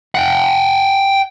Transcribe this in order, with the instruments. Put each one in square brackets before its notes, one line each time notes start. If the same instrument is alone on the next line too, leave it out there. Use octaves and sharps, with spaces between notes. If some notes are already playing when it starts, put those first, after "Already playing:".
[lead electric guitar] F#5 G5